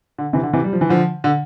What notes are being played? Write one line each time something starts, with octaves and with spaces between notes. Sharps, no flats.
D3
C3 E3
D3
C3 E3
G3
F3
E3
D3 F3
D3